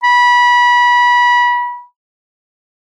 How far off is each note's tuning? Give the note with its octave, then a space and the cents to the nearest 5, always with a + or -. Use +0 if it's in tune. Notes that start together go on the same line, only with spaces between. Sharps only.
B5 -25